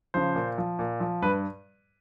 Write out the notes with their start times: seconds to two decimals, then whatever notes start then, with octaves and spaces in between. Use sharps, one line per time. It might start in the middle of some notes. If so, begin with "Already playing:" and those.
0.14 C#3 F3 C5
0.35 A#2
0.58 F3
0.79 A#2
1.00 F3
1.22 G2 B4